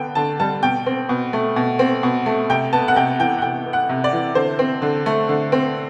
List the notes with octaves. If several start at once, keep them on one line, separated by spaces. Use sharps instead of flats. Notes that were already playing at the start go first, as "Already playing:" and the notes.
Already playing: D3 B3 G5
D3 A5
G3 A5
B2 G5
C4
B2
A3
B2
C4
B2
A3
C3 G5
B3 A5
F#5
C3 G5
E3 G5
F#5
C3 G5
B3
F#5
C3
D5
E3
D3 C5
C4
D3
A3
D3
C4